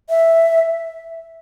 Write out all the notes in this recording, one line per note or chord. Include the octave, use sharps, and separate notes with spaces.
E5